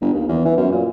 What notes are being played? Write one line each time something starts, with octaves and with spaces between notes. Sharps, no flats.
G1
D#2
E2
E3
F#2
A#2